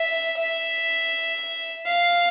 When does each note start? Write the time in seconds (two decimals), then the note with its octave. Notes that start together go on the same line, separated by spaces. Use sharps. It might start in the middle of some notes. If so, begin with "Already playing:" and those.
Already playing: E5
0.37 E5
1.87 F5